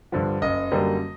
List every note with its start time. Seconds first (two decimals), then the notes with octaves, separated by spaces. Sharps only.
0.12 G2 D3 F3
0.42 F#1 D#5
0.71 F#2 D3 G3 A#3